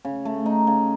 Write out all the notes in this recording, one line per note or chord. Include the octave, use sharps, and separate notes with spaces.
C#3
A3
D#4
C#3